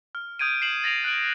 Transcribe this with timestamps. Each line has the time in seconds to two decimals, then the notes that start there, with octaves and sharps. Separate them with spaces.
0.15 F6
0.39 D#6 G6 G#6 D7 D#7
0.62 C7 E7 F#7
0.84 A6 A#6 D7 F7 F#7
1.04 F#6 D7 F#7